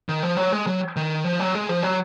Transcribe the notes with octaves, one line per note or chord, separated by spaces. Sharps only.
D#3
F3
F#3
G#3
F#3
D#3
F3
F#3
G#3
F3
F#3